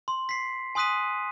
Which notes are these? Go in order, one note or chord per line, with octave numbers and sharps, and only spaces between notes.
C6
B6 C7
G#5 C6 D#6 F#6 B6 D#7